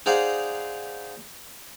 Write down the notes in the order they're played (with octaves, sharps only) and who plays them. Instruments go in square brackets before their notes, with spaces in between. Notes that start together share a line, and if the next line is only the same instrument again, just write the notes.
[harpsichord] D#4 G#4 C5 D5 F5 F#5